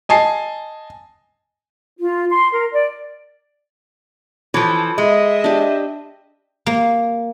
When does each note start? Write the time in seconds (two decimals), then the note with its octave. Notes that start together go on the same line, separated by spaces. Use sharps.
0.09 D#5 G#5 A5 C7
1.99 F4
2.30 C6
2.52 A#4
2.73 D5
4.54 E3 F3 A4 C#5
4.98 G#3 D#5 E5
5.44 D4 G4
6.66 A#3